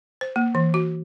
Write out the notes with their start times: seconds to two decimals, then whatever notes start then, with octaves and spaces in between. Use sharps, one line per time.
0.21 C5
0.36 A#3
0.55 E3
0.74 F#4